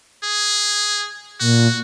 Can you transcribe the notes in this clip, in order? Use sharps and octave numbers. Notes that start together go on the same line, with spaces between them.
G#4
A#2 F#4